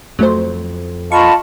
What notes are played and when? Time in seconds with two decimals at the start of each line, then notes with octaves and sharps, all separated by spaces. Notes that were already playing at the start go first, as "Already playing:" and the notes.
0.19 F2 F#3 A3 C5
1.12 F4 D#5 A5 B5 C#6